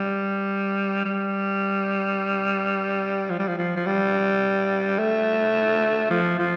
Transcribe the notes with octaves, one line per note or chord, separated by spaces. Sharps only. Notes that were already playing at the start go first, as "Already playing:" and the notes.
Already playing: G3
G3
F3
G3
F3
F3
F3
G3
A3
F3
F3